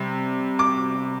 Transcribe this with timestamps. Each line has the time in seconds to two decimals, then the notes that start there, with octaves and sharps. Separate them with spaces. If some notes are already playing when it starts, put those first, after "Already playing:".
Already playing: C3 G3
0.59 D6